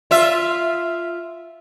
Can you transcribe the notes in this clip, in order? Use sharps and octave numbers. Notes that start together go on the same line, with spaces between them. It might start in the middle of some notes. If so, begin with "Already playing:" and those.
F4 E5